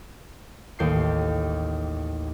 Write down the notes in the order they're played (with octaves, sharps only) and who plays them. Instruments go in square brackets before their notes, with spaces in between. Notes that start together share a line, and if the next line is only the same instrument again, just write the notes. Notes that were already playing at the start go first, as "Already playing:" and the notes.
[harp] A1 D#2 G6 C7